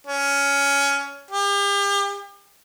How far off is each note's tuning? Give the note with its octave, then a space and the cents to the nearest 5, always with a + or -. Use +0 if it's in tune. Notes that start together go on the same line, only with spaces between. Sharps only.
C#4 +15
G4 +40